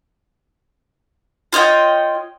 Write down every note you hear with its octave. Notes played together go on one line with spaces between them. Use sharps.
F4 C#5 D#5 G5